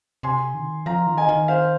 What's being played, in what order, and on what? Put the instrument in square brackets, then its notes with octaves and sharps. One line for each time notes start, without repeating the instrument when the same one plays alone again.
[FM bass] C3 [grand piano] G#5 C6
[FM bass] D#3
[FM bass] F3 [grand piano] F5 A#5
[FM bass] D#3
[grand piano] D#5 G#5
[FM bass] D#3
[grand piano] C5 F5